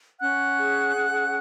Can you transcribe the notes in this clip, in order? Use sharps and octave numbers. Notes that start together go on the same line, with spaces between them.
C#4 F#5 F#6
G#4
C#4